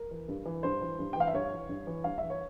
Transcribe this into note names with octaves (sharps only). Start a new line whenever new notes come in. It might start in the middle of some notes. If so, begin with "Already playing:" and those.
Already playing: A#4
E3
G2
E3
G2 C5
E3
G2
G5
E3 F5
E5
G2 C#5
E3
G2
E3
G2 F5
E3 E5
C#5